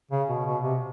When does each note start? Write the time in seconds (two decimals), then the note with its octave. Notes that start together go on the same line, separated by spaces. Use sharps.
0.11 C#3
0.29 B2
0.45 B2
0.62 C3